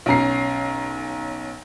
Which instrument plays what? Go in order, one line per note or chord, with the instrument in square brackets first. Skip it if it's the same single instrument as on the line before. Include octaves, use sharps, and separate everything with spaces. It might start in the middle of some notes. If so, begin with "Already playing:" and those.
[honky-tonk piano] B1 C#4 A#5 C7